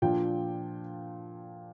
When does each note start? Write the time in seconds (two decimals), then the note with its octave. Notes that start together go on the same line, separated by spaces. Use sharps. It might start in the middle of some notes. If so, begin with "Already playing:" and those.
0.02 A#2 F3 D4 G5